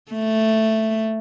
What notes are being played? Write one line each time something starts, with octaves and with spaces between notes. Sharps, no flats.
A3